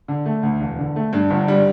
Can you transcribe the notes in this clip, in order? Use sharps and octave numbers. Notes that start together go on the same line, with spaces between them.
D3
A3
D2
E1
D3
A3
G2
G1
G3